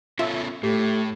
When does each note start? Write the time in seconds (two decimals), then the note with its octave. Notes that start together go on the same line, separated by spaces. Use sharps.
0.19 B3 C#4 F4 A4 E5
0.63 A2 A3 G4